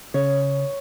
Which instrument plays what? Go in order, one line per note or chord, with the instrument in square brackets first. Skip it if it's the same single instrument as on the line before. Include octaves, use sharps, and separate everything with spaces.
[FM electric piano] C#3 [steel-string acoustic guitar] C#5